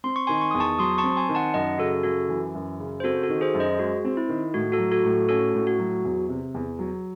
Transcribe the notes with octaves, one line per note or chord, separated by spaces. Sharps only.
C4 C6
C#6
D#3 G#5 C6
C#6
E2 D#6
A5 C#6
F#3 C6 D#6
A5 C#6
C4
G#5 C6
D#3
F#5 A5
F#2 D#5 F#5
C#3 F#4 A4
F#2 F#4 A4
E3
F#2
C#3
C5
C4 F#4 A4
F#4 A4
D#3
G#4 C5
F#2
C5 D#5
G#3 F#4
C4
E4
D#3
A2 F#4
F#4 A4
F#3
F#4 A4
A2
C#4 F#4 A4
A2
F#4
F#3
E2
C3
E2
F#3